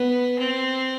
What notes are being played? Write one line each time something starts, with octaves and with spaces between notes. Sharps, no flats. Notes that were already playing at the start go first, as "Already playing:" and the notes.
Already playing: B3
C4